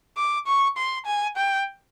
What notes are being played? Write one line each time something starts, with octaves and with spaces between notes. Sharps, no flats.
D6
C#6
C6
G#5
G5